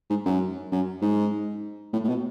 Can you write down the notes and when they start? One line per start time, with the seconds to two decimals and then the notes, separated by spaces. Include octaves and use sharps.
0.10 G#2
0.26 F#2
0.72 F#2
1.02 G#2
1.93 A2
2.04 A2
2.09 B2